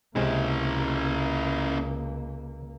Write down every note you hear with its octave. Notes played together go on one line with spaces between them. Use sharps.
C#2 C3 G#3 A#3 C#4 E4